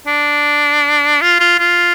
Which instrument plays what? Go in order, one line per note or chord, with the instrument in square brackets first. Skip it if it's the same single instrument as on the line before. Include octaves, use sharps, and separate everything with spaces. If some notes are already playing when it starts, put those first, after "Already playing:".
[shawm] D4
F4
F4
F4